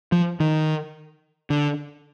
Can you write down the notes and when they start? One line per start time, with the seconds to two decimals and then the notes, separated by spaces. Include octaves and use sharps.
0.12 F3
0.40 D#3
1.50 D3